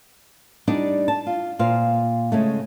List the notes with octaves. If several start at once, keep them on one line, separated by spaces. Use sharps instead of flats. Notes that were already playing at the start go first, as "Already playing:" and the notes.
G3 D4 D#4 D5
A5
F4
A#2 F4 C5 F5
C#3 G#3 A3